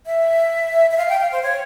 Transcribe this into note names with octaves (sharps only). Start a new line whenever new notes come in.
E5
E5
F5
G5
F5
C5
C#5